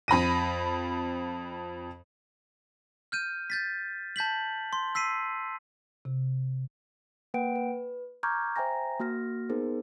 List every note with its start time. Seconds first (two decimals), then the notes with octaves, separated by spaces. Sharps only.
0.08 F2 B5 A#6 D#7
3.12 F6 G6 D#7
3.50 G6 A6 B6
4.16 A5 G6 B6 F#7
4.73 C6
4.95 E6 B6 C7 D#7
6.05 C3
7.34 A#3 B4 F#5 G5 D7
7.56 B4
8.23 A#5 C#6 D6 F6 G6 G#6
8.56 C5 E5 G5 G#5 A#5 A#6
8.99 A#3 F#4 F6 A#6
9.49 B3 D#4 G#4 A#4 C5